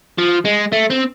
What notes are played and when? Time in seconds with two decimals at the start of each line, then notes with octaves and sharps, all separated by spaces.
0.18 F3
0.45 G#3
0.73 A3
0.90 C4